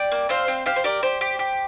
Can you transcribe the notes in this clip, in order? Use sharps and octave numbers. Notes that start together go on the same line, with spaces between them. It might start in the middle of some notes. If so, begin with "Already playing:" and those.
Already playing: D5 G5
A#3
C4 C5 F5
C4
G4 C5 F5
C5
G4 A#4 D5
G4 C5
G4
G4